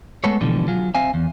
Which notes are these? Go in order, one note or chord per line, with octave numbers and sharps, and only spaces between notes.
G#3 A3 B3 A4 B4 C#5
B2 D3 E3 F3 G3
F#3 F4 G#4
C4 C5 E5 F5 G#5
E2